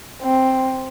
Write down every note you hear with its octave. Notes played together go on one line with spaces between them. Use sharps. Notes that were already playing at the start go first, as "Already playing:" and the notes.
C4